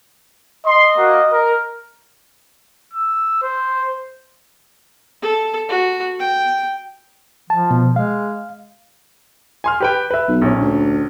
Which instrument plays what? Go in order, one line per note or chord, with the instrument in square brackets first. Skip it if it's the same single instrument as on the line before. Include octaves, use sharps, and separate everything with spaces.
[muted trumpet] D#5 [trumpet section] C6
[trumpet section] A#3 F#4
A#4
[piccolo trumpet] E6
C5
[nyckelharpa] A4
F#4
G5
[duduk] F3 [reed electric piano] A5
[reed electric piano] B2
[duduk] G#3 [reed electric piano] F5
[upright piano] G#5 C6 F6
G4 B4 G5
B4 E5
[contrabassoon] B1
[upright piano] A#1 C#4
[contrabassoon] D2